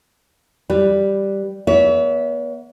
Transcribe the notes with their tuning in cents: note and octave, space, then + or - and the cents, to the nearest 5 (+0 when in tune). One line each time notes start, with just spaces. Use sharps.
G3 +0 B4 +0
B3 -30 C#5 +40 E5 -10